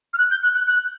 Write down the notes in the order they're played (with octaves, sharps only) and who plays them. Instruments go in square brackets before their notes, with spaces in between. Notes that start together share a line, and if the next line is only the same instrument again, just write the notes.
[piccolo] F6
F#6
G6
F#6
F#6
F#6